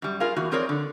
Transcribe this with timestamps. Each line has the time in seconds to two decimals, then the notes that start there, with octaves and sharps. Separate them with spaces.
0.02 F#2 G3
0.20 F4 G#4 A#4 F5
0.37 E2 A#3 F#4
0.51 F3 C4 G#4 A#4 C#5 D5
0.69 D3